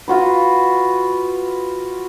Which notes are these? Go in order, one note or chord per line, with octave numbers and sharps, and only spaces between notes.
F4 F#4 B4